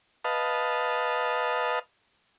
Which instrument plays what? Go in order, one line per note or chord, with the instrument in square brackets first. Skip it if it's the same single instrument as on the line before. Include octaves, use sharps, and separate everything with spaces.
[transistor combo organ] B4 D#5 F5 A5